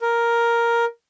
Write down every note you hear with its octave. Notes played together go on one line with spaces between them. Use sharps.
A#4